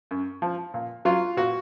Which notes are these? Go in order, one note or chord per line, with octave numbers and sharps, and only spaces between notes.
F#2
F3
A#2
F#3 F4
A#2 F#4